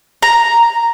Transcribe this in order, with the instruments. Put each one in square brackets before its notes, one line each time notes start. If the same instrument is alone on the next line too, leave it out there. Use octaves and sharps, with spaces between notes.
[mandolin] A#5